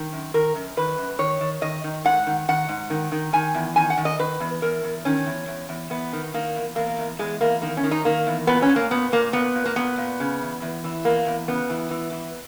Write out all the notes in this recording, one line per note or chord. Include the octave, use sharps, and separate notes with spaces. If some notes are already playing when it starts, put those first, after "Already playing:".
Already playing: D#3
F#2
D#3 A#4
F#2
D#3 B4
F#2
D#3 C#5
D#3
D#3 D#5
D#3
G#2 F#5
D#3
D#3 F#5
G#2
D#3
D#3
D#3 G#5
E2
D#3 G#5
F#5
D#3
D#5
D#3 B4
E2
E2 A#4
E2
D#3 C#4
E2
E2
E2
E2 B3
D#3
D#3 A#3
E2
E2 A#3
E2
E2 G#3
E2 A#3
D#3 A#3
C#4
D#3
D#4
D#3 A#3
E2
A#2 B3
C#4
A#2
A#3
A#2 B3
A#2 A#3
A#2 B3
A#2
A#3
A#2 B3
A#2
C#3
E2
E2
E3
E2 A#3
E2
C#3 B3
E3
E3
E3